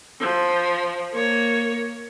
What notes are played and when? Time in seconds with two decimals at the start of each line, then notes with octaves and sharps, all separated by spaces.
0.20 F3
1.13 A#3 C#5